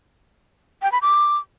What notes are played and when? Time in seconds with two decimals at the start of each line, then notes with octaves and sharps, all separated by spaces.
0.82 G5
0.92 B5
1.02 D6